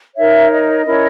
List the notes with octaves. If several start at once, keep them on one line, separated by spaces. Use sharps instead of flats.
D#4 A#4 C#5 E5
D#5
C#4 E4 A#4 C#5